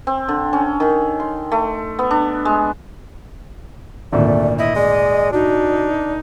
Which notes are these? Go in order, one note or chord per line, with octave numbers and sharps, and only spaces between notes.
C4
D3
C#4
D#3
C6
A3
B3
D4
G#3
G#1 D2 A#2 A3 D5
E4 D#5
G#3 D5
D4 D#4 F#4